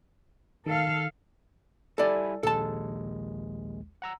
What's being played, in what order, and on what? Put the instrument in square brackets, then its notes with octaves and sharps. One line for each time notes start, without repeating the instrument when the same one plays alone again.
[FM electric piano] D#3 [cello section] A4 F5
[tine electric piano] G3 E4 G#5 [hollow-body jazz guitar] A4 D5
[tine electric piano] A#1 D#2 G#3 [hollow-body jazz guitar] A4 A5
[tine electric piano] F#5 A#5 E6